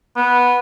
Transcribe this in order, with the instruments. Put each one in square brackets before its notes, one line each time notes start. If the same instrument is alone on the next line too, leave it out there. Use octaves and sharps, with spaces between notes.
[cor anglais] B3